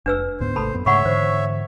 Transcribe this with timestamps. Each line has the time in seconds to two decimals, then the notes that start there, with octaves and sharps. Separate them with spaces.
0.06 F1 D4 B4 E6
0.40 D2 G#2 B3 C5
0.56 G#1 C3 A3 A4 A5 B5
0.74 F#2 B3
0.86 G#2 C#3 A3 C#5 E5 F#5 B5 C#6
1.05 G#2 D3 E3 C5